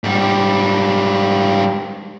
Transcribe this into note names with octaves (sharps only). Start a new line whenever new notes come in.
G#2 G3